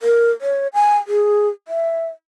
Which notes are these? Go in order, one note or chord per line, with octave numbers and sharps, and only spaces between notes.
A#4
C#5
G#5
G#4
E5